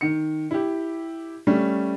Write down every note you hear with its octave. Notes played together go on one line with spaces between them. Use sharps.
D#3 C#7
E4 G4
G3 A3 C#4